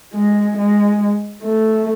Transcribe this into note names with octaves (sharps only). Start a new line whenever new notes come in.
G#3
G#3
A3